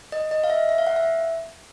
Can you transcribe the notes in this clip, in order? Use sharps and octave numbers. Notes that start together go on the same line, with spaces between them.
D#5
D#5
F5
E5
E5
F5
F#5
E5